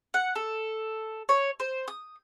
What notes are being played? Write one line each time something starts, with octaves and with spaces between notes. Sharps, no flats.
F#5
A4
C#5
C5
D#6